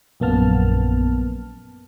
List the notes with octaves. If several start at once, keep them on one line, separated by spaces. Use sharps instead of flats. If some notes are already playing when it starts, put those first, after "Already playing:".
A#1 F#2 A#3 B3 A5 F6